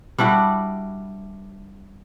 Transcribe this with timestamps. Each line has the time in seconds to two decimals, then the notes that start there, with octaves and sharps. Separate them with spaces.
0.18 G3 D4 E4 F#4